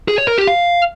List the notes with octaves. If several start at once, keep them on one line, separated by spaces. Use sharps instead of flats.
G#4
C#5
A#4
G4
F5